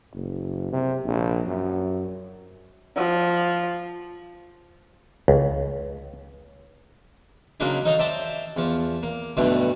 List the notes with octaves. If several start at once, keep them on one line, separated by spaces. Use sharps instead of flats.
F#1
C3
A#1
F#2
F3
C#2
C#3 F#3 G#3 A#3 D4 D#4
D#4 A4 C#5 D#5 F5 A#5
C5 D5 E5 G5 A5 A#5
E2 F3
A#3
B1 G2 B2 D3 A3